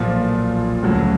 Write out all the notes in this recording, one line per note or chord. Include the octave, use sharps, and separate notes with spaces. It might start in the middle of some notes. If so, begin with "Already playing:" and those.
Already playing: B1 A#2 F3
D2 C#3 F#3 A3